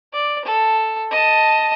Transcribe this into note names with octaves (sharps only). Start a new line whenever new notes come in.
D5
A4
D#5 A5